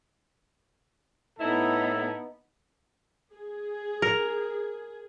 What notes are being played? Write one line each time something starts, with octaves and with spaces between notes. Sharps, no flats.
A2 B3 D#4 E4 A4
G#4
A#4